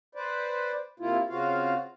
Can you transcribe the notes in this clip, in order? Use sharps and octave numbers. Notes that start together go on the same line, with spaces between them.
B4 C5 D5
C3 A#3 E4 F4
C#3 C4 F4 F#4 F5